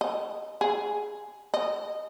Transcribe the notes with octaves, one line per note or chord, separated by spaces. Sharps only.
D#5
G#4
D#5